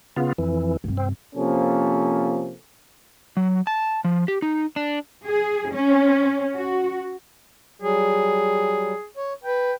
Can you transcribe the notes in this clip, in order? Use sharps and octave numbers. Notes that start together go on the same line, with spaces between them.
C#3 B3 F4
F2 E3
G2 C3
C4
C3 F3 A#3 C#4 A4
F#3
A5
F3
G4
D#4
D4
G#4
C#4
F#4
F#3 G3 G#4
C#5
B4 G5